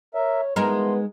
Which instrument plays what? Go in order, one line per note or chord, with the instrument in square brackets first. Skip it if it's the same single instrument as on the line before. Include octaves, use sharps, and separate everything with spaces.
[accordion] A#4 E5 [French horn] C#5
[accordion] E3 F3 C6 [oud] G#3 D#4 A#4 [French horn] B3